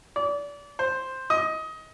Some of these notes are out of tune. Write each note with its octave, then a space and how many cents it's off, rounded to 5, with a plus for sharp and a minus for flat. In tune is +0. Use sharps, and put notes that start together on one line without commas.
D5 -30
C5 +5
D#5 +20